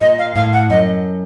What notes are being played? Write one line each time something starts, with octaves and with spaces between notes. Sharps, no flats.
A#2 D#5
F5
A2 F5
F#5
F#2 D#5